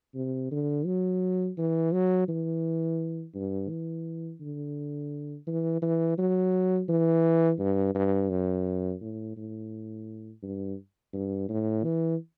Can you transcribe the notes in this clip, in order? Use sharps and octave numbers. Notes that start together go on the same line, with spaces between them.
C3
D3
F#3
E3
F#3
E3
G2
E3
D3
E3
E3
F#3
E3
G2
G2
F#2
A2
A2
G2
G2
A2
E3